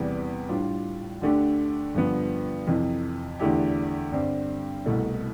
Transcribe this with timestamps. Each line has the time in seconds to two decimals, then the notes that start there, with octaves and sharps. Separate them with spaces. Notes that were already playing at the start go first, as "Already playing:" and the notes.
Already playing: E2 C3 E3 G3 B3
0.49 A2 G3 D4 F4
1.21 D2 D3 A3 D4 G4
1.94 G2 D3 F3 B3
2.67 F2 C3 E3
3.40 E2 D3 A3 E4 G4
4.12 G2 D3 G3 C4
4.85 C2 B2 A3 E4